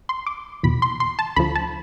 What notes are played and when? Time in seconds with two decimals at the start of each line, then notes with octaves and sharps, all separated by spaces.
0.09 C6
0.27 D6
0.63 E2 B2 B5
0.82 C6
1.00 C6
1.19 A5
1.36 D2 D3 F3 B5
1.56 A5